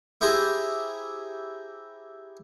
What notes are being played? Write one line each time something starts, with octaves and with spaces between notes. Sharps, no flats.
E4 G4 G#4 C5 A#5 C6